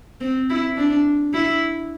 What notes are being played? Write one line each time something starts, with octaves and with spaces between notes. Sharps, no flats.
C4
E4
D4
E4